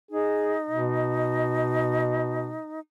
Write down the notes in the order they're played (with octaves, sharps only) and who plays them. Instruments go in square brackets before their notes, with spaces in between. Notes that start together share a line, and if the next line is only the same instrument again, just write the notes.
[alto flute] D#4 [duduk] G#4
[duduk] B2